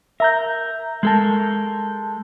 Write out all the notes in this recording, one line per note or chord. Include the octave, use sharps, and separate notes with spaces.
A#4 E5 A#5 G6
G#3 A4 A#4 A5 G6